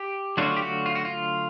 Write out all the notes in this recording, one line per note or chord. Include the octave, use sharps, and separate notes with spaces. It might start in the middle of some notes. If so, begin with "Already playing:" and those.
Already playing: G4
D3 F#3 A3 D4 F4 F#4
G4
F#4
F4
F#4
F4